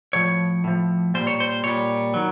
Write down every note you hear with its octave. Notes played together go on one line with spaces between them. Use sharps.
A2 F3 C#5
A2 F3
A#2 G3 C5
C#5
C5
A#2 G3 C#5
D#3 F#3